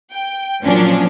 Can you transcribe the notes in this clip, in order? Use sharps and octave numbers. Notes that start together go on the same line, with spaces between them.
G5
A#2 F3 F#3 C#4 D4